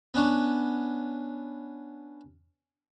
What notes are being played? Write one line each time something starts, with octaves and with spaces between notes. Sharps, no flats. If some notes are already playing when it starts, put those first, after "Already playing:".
B3 C#4 D4 C#5